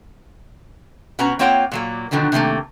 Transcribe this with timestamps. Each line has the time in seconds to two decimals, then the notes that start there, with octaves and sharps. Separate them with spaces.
1.19 B2 B3 C#4 F#4 A#5
1.39 A#3 C4 F4 C#5 F#5 G5
1.72 A#2 F#3 A#3
2.11 B2 D3 D#3 F3 F#3
2.32 C3 D#3 F3 A3 A#3